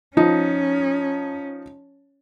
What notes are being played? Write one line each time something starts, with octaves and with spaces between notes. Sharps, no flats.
F3 C#4 D#4